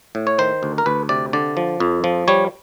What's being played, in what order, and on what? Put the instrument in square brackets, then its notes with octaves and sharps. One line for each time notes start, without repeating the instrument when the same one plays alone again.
[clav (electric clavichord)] A2
C#5
D#3 C5
D2
A#4
D2 B4
C3 D5
D3 D5
F3
F2
F3
G3 C#5